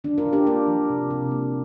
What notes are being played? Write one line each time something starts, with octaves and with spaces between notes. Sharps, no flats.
D3 D4
F4 A#4
D3
D4 G4
A#3 F4 A#4
F3
C3
C3
A#3